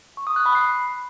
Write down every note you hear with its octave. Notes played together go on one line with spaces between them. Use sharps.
C#6
D#6
F#6
B5
C7